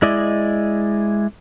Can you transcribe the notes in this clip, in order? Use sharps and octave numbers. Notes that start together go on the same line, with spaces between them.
G#3 E4 D5 D#5